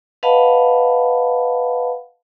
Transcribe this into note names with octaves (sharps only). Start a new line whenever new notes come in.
B4 D#5 F5 F#5 A5 B5